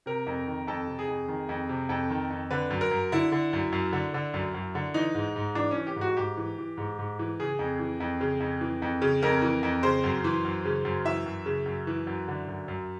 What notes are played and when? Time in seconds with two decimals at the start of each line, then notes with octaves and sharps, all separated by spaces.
0.06 C3 A#4
0.27 F2
0.47 D#3
0.67 F2 A4
0.87 C3
0.99 G#4
1.08 F2
1.28 D#3
1.49 F2
1.69 C3
1.89 F2 A4
2.10 D#3
2.30 F2
2.51 D3 B4
2.70 F#2
2.81 A#4
2.91 F#2
3.12 D3 E4
3.32 D3
3.53 F#2
3.72 F#2
3.93 D3
4.14 D3
4.34 F#2
4.54 F#2
4.75 D3
4.94 E3 D#4
5.15 G#2
5.36 G#2
5.55 E3 D4
5.71 C#4
5.76 E3
5.87 G4
5.96 G#2
6.01 F#4
6.17 G#2 G4
6.37 E3
6.58 E3
6.77 G#2
6.99 G#2
7.19 E3
7.40 C#3 G#4
7.59 F2
7.79 E3
8.00 F2
8.21 C#3
8.40 F2
8.61 E3
8.82 F2
9.02 C#3
9.23 F2 A#4
9.42 E3
9.63 F2
9.83 C#3 C5
10.04 F#2
10.24 E3
10.45 F#2
10.65 C#3
10.85 F#2
11.05 E3 E5
11.26 F#2
11.46 C#3
11.66 F#2
11.87 E3
12.07 F#2
12.28 D3
12.48 F#2
12.68 F#2